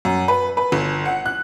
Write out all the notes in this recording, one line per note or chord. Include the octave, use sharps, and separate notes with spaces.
F#2
B4
B4
G1
F#5
F#6